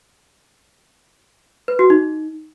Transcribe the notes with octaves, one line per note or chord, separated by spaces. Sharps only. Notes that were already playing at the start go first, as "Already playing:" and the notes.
B4
F#4
D#4